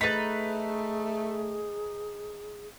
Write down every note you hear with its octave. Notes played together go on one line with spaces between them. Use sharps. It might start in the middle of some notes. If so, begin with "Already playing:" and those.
A3 D#4 G#4 B4 A6 B6